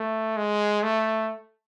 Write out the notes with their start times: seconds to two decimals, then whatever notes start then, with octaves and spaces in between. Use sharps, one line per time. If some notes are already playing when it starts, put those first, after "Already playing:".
Already playing: A3
0.37 G#3
0.83 A3